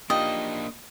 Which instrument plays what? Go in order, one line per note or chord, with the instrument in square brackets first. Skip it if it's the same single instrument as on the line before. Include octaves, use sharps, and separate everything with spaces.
[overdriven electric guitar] A#3 D4 [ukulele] D#4 F4 G4 [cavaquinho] D#5